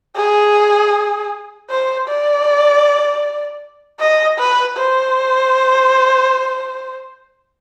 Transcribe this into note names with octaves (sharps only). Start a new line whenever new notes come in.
G#4
C5
D5
D#5
B4
C5